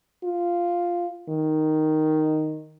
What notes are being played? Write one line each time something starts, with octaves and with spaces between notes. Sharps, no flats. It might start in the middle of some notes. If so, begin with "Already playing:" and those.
F4
D#3